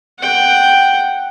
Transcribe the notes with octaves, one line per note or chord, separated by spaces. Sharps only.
F#5 G5